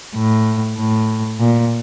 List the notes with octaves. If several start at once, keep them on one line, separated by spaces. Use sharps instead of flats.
A2
A2
A#2